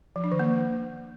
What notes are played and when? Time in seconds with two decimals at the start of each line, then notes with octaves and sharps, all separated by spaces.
0.16 F3
0.24 D4
0.32 D#3
0.39 A#3